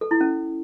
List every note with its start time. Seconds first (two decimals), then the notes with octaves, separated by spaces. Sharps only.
0.01 A4
0.11 E4
0.21 C#4